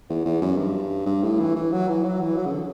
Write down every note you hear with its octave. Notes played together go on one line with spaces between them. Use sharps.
E2
E2
F#2
G2
G2
A2
E3
E3
F#3
E3
F#3
E3
F#3
C#3
D3